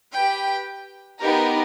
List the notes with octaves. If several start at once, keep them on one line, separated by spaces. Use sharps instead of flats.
G4 B4 G5
B3 D#4 G4 A#4